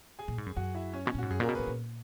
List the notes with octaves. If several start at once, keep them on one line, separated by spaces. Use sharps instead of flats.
G#4 G#5
A#2
G#2
F#2
F#2 F#4 F#5
E4 E5
C#4 C#5
B2 C#4 C#5
A#2
G#2 F#4
F#2 G#4
A#2 A#3 A#4
B2
A#2 B3 B4
A#2